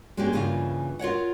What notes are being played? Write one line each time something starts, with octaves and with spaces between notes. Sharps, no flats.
G#3 A#3 C#4 D4 G4
G2 C#3 E3 A#3 F4
F4 A#4 C#5 F#5